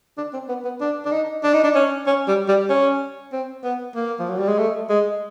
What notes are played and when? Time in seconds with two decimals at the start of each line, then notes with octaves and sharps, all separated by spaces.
0.17 D4
0.33 C4
0.49 B3
0.65 B3
0.81 D4
1.05 D4
1.12 D#4
1.43 D4
1.54 D#4
1.64 D4
1.75 C#4
2.06 C#4
2.28 G3
2.48 G3
2.69 C#4
3.32 C4
3.64 B3
3.95 A#3
4.19 F3
4.29 F#3
4.39 G3
4.48 G#3
4.58 A3
4.89 G#3